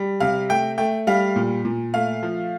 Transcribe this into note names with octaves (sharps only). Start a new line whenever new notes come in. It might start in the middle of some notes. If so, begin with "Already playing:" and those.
Already playing: G3
C3 F5
A3 G5
A3 G5
G3 F5
A#2
A#2
A3 F5
F3